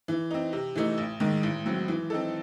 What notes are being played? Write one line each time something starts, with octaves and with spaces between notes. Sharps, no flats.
E3
C4 D#4
C3
E3 A3 D#4
A1
G#2 D#3
A1
A2 F#3 C4
E3
C4 D#4 A4